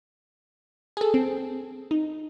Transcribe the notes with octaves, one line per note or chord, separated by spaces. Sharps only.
G#4 A4
C4
D#4